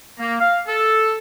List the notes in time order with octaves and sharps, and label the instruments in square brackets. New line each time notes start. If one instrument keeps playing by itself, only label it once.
[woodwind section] A#3
F5
A4